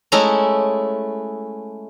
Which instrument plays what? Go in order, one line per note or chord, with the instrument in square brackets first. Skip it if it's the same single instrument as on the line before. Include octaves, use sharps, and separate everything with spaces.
[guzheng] G#3 A3 C#4 E4 A#5